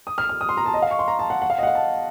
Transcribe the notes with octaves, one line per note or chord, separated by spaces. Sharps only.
D#6
F6
F6
D#6
C6
A#5
A5
D#5
F5
C#6
C6
A#5
A5
F#5
F#5
F5
D#5
F#5
F5
A5